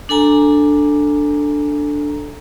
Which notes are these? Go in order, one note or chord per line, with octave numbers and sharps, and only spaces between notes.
D4 A4 G#5 A#5